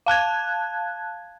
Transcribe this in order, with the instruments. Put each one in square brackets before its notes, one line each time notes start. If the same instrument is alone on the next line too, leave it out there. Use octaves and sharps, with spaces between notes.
[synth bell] F5 A5 F#6 G#6